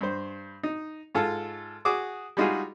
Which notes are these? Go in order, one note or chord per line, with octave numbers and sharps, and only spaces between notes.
G2 C5
D#4
G#2 F4 A4
F#4 G#4 D6 D#6
G3 G#3 D#4 F4 F#4 G#4